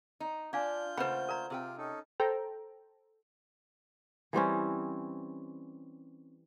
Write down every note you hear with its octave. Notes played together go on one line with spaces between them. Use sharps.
D#4
D4 F4 D5 F5 G#5 G6
C#3 A3 A#3 B4 C5 F#5 B5
A#4 D5 A#5
C3 F4 G#4 G5
C#4 D#4 A4
A4 C5 G5 A#5
E3 G3 C4 C#4